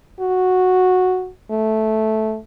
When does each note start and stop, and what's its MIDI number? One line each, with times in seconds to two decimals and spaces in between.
0.21 1.30 66
1.51 2.38 57